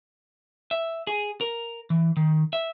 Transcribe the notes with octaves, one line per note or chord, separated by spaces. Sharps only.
E5
G#4
A#4
E3
D#3
E5